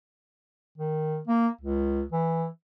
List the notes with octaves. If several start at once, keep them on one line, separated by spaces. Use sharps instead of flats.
D#3
A#3
C#2
E3